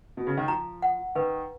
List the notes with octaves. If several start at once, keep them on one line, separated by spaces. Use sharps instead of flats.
B2
C#3
D#3
F3 A#5
F#5
D#3 B4